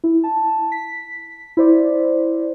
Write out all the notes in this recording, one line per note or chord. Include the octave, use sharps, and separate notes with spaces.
E4
A5
B6
E4 C5 D5